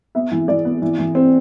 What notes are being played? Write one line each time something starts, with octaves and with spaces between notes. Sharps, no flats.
B3 E5
E3
E3 D5
B3
E3
E3
C4